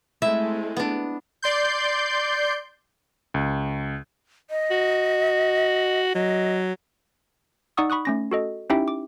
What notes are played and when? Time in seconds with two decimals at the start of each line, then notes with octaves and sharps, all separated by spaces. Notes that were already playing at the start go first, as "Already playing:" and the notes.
0.22 G#3 A3 C4 E4 E5
0.77 B3 D4
1.42 D5 C6 G6
3.34 C#2
4.50 D#5
4.71 F#4
6.15 F#3 D#5
7.77 D#4 D5 F#5 C#6 D#6 E6
7.90 B5 C#6 D#6 F#6
8.05 A3 C#4 A#6
8.31 F#4 A4 D#5
8.70 C#4 D#4 E4 G4 E5 G5
8.88 D6